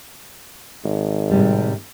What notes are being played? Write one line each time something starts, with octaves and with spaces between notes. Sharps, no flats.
G#1
A2 C3 G3